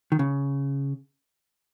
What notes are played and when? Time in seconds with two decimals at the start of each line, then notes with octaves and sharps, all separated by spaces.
0.12 D#3
0.19 C#3